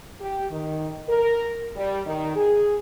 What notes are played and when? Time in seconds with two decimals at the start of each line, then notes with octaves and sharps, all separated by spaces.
0.21 G4
0.51 D#3
1.09 A#4
1.76 G3
2.06 D#3
2.36 G#4